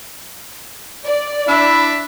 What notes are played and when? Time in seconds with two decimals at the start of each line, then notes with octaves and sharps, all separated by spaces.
1.05 D5
1.48 D4 E4 E5